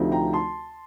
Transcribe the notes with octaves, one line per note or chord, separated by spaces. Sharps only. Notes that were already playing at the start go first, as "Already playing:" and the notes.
Already playing: D2 C3 F3 A3 D#4
G5 A#5
A5 C6